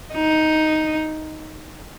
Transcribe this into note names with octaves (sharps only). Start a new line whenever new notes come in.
D#4